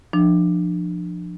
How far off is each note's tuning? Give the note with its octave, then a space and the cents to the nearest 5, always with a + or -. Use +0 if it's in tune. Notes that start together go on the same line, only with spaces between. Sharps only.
F3 +0 D4 +30